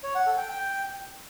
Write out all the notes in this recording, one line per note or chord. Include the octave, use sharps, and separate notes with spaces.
C#5
F#5
A4
G5
G5